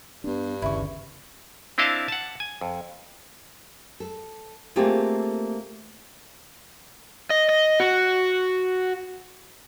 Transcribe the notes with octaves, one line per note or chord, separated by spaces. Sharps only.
G2 B3 D4
G1 D#2 C#3 E4 C#6
C4 D4 E4 D#5 F5 A5
F#5 A5
G#5
F2
A4
A3 A#3 C4 F4 G4 G#4
D#5
D#5
F#4